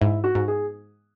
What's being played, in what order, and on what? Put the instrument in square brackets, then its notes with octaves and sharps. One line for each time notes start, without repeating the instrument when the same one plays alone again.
[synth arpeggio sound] G#2 [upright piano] E4
[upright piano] F#4
[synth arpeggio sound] G#2
[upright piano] G#4